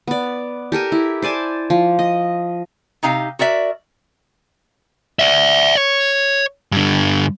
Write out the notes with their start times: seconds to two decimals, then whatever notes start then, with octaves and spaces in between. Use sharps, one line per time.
0.07 B3 D5
0.72 G4 A4 A#4 G#5
0.92 E4
1.22 C5 D5 G#5 A5
1.70 F3
1.99 D#5
3.03 C3 D#4 G4 F5
3.39 F#4 A#4 D5 E5
5.19 D5 E5
5.77 C#5
6.72 G2 D3